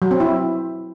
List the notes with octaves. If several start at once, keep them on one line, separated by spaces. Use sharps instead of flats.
F#3
C4
E4